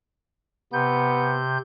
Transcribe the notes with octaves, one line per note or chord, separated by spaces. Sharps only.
C3 B3 G6